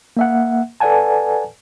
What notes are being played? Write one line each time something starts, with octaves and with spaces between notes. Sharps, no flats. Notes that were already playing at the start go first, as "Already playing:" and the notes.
A#3 E5 F#5
A4 B4 D5 F#5 G#5 A5